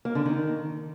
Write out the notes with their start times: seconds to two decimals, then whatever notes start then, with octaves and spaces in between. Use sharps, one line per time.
0.05 A#3
0.15 D3
0.26 D#3